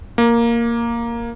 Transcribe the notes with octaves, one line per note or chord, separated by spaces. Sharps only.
A#3